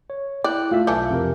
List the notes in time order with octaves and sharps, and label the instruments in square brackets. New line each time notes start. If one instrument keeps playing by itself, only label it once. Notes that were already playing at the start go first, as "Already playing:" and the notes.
[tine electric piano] C#5
[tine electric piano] E4 G5 F#6 [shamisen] D5
[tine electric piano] A3 E5 [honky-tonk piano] F4
[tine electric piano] B1 G6 [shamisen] E3 A3 D4
[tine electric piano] F2 C3 A#4